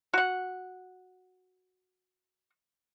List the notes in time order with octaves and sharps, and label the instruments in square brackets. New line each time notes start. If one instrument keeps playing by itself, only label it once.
[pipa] F#4 F#5